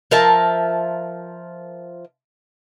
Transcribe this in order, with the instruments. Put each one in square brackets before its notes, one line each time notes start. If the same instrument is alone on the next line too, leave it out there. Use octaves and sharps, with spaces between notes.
[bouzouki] F3 A#4 E5 A5